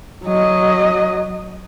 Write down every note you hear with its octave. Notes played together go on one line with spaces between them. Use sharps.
F#3 D#5